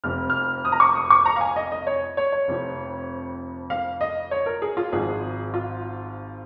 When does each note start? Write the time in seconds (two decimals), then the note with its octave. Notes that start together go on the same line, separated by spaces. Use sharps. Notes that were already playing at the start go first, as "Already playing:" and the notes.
0.04 F1 F2 F3 F6
0.30 F6
0.65 D#6
0.72 A#5
0.80 C#6
0.95 D#6
1.10 C#6
1.26 A#5
1.36 F5
1.41 G#5
1.56 D#5
1.72 D#5
1.87 C#5
2.17 C#5
2.32 C#5
2.48 F1 F2 F3
3.70 F5
4.01 D#5
4.31 C#5
4.46 A#4
4.62 G#4
4.77 F4
4.92 G#1 G#2 F3 G#4
5.54 F4